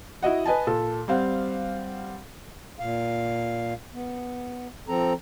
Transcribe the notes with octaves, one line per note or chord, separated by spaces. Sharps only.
E4 F#4 D#5 F#5
B4 D#5 G#5 A5
A#2 A4
G3 C4 F5 F#5
A#2 F5
B3
F3 C4 A4 A#5